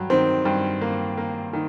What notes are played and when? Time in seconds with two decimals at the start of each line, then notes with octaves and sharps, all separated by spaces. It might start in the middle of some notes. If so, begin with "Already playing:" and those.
Already playing: G2 F#3
0.10 D#3 C4
0.45 G2
0.81 A#3
1.18 A#3
1.53 D#3